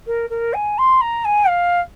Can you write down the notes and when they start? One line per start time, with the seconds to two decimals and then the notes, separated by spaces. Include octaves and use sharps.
0.07 A#4
0.30 A#4
0.54 G#5
0.78 C6
1.01 A#5
1.25 G#5
1.48 F5